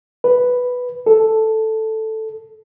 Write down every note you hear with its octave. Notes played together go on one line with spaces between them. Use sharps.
B4
A4